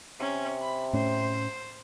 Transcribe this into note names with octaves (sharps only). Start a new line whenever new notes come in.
C3 C#4
B5
A2 C#4 C5